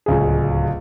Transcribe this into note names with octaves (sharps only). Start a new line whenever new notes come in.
D1 C#2 G#4